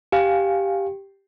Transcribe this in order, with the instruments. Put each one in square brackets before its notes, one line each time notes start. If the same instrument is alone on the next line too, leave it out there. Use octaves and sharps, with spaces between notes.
[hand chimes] G4 [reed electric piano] F5 G#5